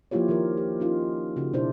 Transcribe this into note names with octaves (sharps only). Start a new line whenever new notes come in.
F3 A#3 E4 F4 G4 C#5
D#3 F3 G4 A#4
G4
C#4 D#4 F4
C#3 C#4 F#4
B2 D4 E4 C5 D5